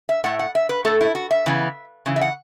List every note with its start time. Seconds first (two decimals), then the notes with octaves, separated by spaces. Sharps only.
0.09 E5
0.24 A2 A3 F#5
0.39 F#5
0.55 E5
0.69 B4
0.85 A2 A3 A4
1.01 E4
1.15 F#4
1.31 E5
1.46 C#3 E3 B3
2.06 C#3 E3
2.16 E5
2.21 F#5